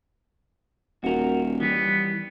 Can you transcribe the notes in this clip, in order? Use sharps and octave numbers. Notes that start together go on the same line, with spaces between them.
D#1 F#4 A#4
E3 G3 B3